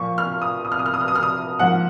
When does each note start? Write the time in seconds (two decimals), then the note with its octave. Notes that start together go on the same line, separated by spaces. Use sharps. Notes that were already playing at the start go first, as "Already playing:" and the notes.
Already playing: A#2 F3 A#3 C#6
0.18 F6
0.42 D#6
0.65 D#6
0.72 F6
0.79 D#6
0.86 F6
0.94 D#6
1.01 F6
1.08 D#6
1.16 F6
1.23 D#6
1.59 G#2 F3 A#3 F#5